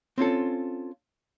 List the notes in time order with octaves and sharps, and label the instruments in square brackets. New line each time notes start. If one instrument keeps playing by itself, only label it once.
[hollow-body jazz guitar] C4 C#4 F4 A4